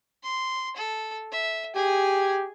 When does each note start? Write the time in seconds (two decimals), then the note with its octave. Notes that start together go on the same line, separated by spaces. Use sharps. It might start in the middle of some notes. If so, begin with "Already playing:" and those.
0.23 C6
0.77 A4
1.32 E5
1.75 G4 G#4 G#5